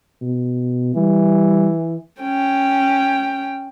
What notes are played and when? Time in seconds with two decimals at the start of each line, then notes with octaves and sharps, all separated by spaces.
0.22 B2
0.96 E3 G3
2.22 C#4 G5